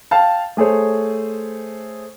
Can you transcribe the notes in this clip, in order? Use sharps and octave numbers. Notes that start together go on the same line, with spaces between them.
F5 G5 A5
A3 G#4 C5 C#5